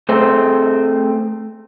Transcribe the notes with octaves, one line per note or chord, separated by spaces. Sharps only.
A3 C4 G#4 C5